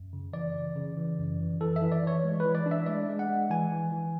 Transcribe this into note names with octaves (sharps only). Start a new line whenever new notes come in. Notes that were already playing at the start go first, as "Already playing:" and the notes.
Already playing: F#2
C#3
E3 D5
E3
C#3
E3
F#2
E3
E3 A4
E5
E3
D5
E3 C#5
G#3
B4
E3
D5
D4
E5
G#3 D5
G#3
F#5
G#3
E3 G#5
E3
E3